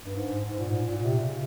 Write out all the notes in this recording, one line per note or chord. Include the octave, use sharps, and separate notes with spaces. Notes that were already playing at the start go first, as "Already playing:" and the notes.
G2
G#2
G#2
A#2
G#2
A#2
C3
C#3